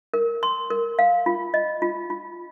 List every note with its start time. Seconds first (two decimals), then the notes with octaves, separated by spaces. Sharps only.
0.14 A#4
0.43 C6
0.70 A#4
0.99 F5
1.26 F4
1.54 D#5
1.82 F4
2.10 F4